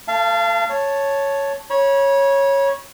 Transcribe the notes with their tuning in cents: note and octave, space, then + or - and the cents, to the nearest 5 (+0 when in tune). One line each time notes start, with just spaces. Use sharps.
A3 +30 F5 -30 A5 +0
C#5 +0 A5 +0
C#5 -5 B5 -40